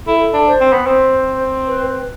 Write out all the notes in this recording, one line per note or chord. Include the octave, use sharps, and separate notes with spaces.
E4 A4
D4
C5
C4
B3
C4 C5
B4
B4